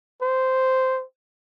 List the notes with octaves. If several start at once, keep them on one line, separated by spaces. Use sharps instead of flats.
C5